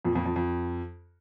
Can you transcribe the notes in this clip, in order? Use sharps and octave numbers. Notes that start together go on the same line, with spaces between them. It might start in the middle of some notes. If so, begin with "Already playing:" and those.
F2 A#2
F2 A#2
F2
F2